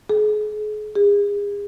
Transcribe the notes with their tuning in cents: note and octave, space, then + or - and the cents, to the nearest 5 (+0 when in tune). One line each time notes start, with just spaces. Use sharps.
G#4 +40
G#4 -35